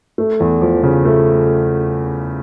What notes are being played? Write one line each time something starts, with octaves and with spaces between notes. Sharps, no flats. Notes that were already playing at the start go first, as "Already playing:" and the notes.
A3
E2
F3
C#3
A3